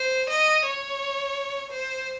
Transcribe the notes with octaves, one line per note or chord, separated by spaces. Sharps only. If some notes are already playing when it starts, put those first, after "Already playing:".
Already playing: C5
D#5
C#5
C5